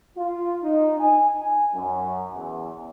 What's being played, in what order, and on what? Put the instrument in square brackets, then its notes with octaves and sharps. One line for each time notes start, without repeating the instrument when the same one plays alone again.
[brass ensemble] F4
D#4
G#5
G#5
F#2
E2